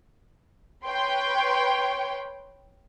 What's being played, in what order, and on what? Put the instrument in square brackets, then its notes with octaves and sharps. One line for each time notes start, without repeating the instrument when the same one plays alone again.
[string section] B4 C#5 G5 C6